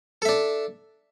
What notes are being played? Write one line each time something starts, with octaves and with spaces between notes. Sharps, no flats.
D4 A4 E5